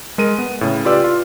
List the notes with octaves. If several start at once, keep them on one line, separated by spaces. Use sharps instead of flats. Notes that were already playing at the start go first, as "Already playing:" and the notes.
G#3 A#4 D#7
B3
A2 C#3
F4 G4 B4 D5 E6
F4